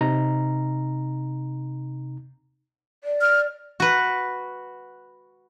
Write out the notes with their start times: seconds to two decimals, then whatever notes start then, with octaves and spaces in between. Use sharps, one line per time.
0.01 C3 D#4 A#5
3.04 D5
3.21 F6
3.80 F#4 B4